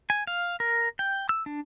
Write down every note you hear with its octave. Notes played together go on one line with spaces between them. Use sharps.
G#5
F5
A#4
G5
E6
D4